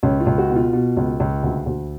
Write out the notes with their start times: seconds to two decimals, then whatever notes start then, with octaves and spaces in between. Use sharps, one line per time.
0.03 C#2 C#4
0.20 F4
0.26 C#2
0.38 F#4
0.50 B2
0.56 F4
0.73 B2
0.97 C#2
1.20 C#2
1.43 D2
1.66 D2